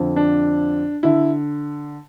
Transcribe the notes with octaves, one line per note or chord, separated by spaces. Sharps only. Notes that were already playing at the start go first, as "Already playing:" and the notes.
Already playing: F2 D3 F3
D4
D3 E4